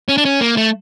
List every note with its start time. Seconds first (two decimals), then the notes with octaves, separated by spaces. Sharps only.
0.09 C#4
0.18 D4
0.25 C#4
0.41 A#3
0.57 A3